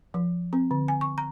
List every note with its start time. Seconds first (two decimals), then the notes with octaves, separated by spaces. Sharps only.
0.14 F3
0.53 C4
0.71 D3
0.88 G#5
1.01 C#6
1.18 A#5